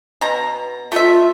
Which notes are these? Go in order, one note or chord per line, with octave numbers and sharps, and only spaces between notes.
B2 A#5
A3 F4 E5